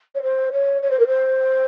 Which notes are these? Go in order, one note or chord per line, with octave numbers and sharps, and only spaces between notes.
C#5
C5
C#5
C#5
C5
A#4
C5